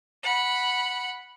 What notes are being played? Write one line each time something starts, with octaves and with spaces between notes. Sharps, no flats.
F#5 B5